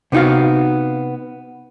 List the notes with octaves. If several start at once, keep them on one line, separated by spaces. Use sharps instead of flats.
C3 B3 D#4 F#4 F5